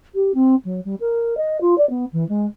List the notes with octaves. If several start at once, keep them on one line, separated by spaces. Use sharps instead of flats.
G4
C4
F#3
G3
A#4
D#5
F4
D5
B3
E3
G#3